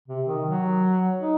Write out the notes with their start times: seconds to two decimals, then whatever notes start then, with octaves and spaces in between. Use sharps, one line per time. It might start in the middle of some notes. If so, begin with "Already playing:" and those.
0.08 C3
0.27 D#3
0.46 F#3
1.21 D#4